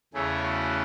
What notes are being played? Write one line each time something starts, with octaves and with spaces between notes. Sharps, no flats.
E2 C#3 E3 A3 C#4 G#4
F#4